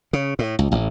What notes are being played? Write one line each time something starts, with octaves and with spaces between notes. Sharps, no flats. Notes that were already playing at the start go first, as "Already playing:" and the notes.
C#3
A2
C#2
A1